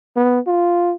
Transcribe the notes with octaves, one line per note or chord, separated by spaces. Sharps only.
B3
F4